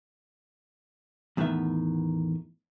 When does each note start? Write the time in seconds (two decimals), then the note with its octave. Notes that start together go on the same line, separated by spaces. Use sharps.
1.37 E2 A2 D#3 B3 B4 E5